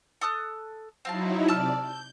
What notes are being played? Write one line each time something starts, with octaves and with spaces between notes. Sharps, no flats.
A4 D#6 F#6
F#3 C4 D#4 E4 F5 A5
C3 D5 A5 E6 F6
G6